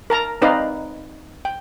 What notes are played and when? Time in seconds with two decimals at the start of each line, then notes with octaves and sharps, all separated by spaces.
0.10 A#4 A5 A#5
0.42 C4 D#4 B4 D5 D#5 F5
1.45 G5